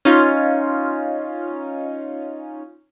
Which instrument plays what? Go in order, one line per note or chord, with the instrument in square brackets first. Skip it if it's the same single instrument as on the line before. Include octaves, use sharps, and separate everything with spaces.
[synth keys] C#4 D#4 F4